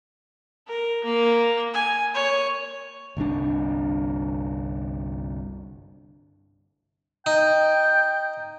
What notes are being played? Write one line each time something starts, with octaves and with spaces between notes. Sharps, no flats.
A#4
A#3
G#5
C#5
G1 C2 D3 D4
D#4 G5